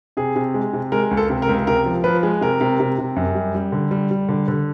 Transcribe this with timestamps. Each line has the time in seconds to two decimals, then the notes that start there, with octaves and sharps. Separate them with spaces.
0.17 C3 G#4
0.36 C3
0.54 G#3
0.73 C3
0.92 G#3 A#4
1.11 C#2
1.17 A4
1.30 C3
1.42 A#4
1.49 C#2
1.67 C3 A#4
1.85 F3
2.04 F3 B4
2.23 G#3
2.41 C3 A#4
2.61 C3
2.80 C3
2.99 C3
3.16 F#2
3.35 G3
3.55 G3
3.72 D3
3.91 G3
4.11 G3
4.29 D3
4.48 D3